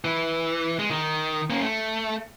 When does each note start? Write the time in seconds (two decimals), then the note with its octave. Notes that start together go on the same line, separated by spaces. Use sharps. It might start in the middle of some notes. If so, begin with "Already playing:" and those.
0.05 E3
0.79 G#3
0.91 D#3
1.50 A#3 C#4
1.62 A3